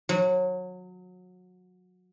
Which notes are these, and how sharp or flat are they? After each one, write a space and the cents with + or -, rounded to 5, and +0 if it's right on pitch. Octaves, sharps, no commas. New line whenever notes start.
F#3 -25